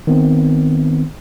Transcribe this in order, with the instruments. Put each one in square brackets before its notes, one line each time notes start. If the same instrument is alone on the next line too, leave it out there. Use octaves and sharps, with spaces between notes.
[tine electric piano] D#3 B3 C4